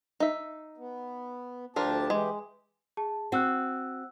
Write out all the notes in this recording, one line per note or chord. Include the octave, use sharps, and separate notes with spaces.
D#4 E5
B3
D2 F3 D4 G4 A#4 A5
E3 G#3 G4
G#4 A5
C4 F#4 F#5 E6 F#6